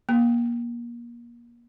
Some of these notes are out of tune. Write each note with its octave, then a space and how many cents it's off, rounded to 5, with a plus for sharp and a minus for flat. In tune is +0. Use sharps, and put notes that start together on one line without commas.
A#3 +30